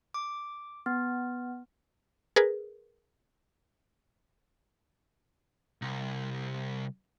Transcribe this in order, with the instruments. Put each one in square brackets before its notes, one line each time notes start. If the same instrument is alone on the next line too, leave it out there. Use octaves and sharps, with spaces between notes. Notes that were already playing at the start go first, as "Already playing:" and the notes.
[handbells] D6
B3
[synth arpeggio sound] G#4 A#4 B4
[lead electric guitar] C2